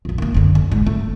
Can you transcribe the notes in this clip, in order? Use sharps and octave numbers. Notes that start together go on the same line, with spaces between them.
A#1 F2
D#3 A#3
F#1 D3
D#2
G#2
A3